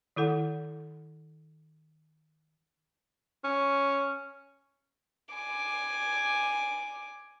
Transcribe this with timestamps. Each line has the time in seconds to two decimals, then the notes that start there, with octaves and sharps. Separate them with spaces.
0.16 D#3 E4 A4 F#5
3.44 C#4
5.35 G#5 D6